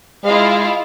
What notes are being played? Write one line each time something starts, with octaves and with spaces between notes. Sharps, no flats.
G#3 E4 F4 F5